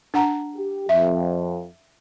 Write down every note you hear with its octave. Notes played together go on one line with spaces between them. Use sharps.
D4 F#5 A#5
G4
F2 E5